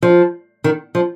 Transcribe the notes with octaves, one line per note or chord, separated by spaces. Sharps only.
F3
D#3
F3